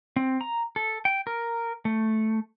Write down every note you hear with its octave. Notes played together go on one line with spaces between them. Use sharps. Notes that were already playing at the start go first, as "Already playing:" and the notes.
C4
A#5
A4
G5
A#4
A3